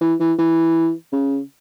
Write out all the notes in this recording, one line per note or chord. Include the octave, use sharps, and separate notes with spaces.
E3
E3
E3
C#3